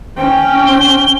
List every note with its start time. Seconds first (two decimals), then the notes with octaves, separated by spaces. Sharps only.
0.17 C#4 G5
0.67 G7